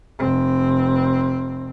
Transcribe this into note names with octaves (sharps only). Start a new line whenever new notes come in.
F1 C4